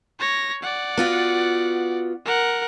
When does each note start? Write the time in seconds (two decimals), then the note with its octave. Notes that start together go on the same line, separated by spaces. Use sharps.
0.19 C#5 A#6
0.62 D5 F#5
0.97 B3 F4 F#4
2.25 A#4 F#5